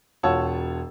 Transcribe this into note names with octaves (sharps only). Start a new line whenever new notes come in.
E1 F4 C#5 F#5 A5 E6